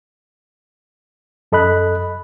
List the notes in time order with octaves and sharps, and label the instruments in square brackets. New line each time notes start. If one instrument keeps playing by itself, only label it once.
[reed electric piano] F#2 A4 D#5 B5 F#6